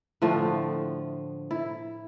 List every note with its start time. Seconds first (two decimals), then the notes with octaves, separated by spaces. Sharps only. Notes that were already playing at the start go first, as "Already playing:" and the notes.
0.22 A2 D3 F3 A3
1.51 E4